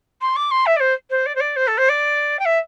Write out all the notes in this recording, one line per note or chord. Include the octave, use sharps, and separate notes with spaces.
C6
D6
C6
E5
D5
C5
C5
D5
C5
D5
C5
A4
C5
D5
G5
E5